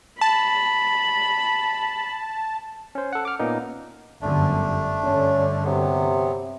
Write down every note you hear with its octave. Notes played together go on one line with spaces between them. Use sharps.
A5 B5
C#4 C5
A4 F#5
D6 F6
A#2 A#3 B3 C#4 D#4
G1 F#2 D3 A3 D4
G2 D3 C#4
C3 F#3 B3